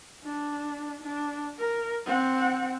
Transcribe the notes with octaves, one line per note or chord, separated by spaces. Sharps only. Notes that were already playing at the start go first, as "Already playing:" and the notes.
D4
D4
A#4
C4 F#5